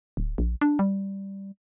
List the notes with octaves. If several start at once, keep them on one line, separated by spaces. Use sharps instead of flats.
D1
A#1
D4
G3